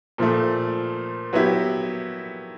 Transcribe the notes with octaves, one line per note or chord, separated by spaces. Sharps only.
A#2 F3 A3
F#3 B3 E4 G4